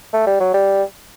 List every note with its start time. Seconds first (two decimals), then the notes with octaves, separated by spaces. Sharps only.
0.13 A3
0.27 G3
0.40 F#3
0.54 G3